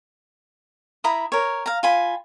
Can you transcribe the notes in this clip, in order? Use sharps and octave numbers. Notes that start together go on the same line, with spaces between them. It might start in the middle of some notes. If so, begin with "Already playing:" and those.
E4 A#5 B5 D#6
A#4 C#5
F5 A#5
F4 G#5 B5